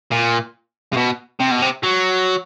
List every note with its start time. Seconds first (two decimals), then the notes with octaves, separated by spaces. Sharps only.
0.12 A#2
0.93 C3
0.97 B2
1.40 C3
1.51 B2
1.62 C3
1.83 F#3